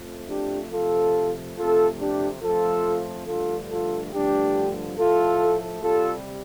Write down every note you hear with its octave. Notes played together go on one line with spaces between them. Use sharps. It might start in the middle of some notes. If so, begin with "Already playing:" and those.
Already playing: F2 F3 A3
D4 G4
C3 F3 A3 F4 A4
F2 C3 A3 F4 A4
D4 G4
F2 F3 A3 F4 A4
G2 D3 F3 A3 F4 A4
F4 A4
G2 D3 F3 A3 D4 G4
A2 F3 A3 F4 A4
C3 G3 F4 A4